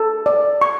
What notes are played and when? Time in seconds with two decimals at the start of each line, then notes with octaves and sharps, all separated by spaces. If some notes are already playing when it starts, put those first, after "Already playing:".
Already playing: A4
0.26 D5
0.61 C#6